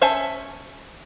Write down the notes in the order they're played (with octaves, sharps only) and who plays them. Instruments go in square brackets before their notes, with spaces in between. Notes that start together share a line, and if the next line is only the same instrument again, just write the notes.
[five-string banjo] C#4 C5 E5 G#5 A5